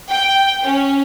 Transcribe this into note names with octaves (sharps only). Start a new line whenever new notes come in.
G5
C#4